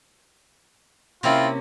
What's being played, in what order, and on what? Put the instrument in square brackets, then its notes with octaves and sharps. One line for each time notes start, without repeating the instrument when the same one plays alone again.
[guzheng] C3 A#3 C#4 [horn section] C4 E4 F4